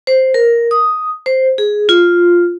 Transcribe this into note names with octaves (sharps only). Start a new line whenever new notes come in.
C5
A#4
D#6
C5
G#4
F4